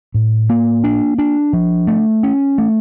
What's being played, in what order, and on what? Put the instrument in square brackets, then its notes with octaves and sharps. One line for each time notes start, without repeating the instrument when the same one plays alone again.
[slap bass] A2
A#3
D4
D4
F3
A3
C#4
A3